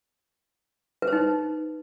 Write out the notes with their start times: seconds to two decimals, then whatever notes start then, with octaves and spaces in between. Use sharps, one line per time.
1.02 B4
1.07 C5
1.13 D#4